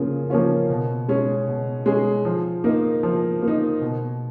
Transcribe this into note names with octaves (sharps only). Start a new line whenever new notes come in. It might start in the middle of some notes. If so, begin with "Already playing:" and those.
Already playing: C#3 F3 A#3 C#4 F4
F3 A#3 C#4 F4
B2
G#3 C#4 G#4
B2
G#3 C#4 G#4
F3
A#3 D#4
F3
A#3
D#4
B2